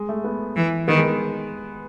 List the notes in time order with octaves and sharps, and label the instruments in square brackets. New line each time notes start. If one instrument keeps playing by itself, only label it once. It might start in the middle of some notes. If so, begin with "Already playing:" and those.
Already playing: [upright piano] G#3
A3
B3
[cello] E3
[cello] D#3 [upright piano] B3
[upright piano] G#3